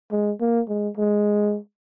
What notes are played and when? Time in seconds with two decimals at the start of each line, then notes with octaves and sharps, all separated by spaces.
0.12 G#3
0.41 A#3
0.69 G#3
0.97 G#3